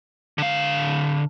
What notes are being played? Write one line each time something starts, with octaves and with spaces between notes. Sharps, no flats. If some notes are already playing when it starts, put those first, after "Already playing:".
D3 F5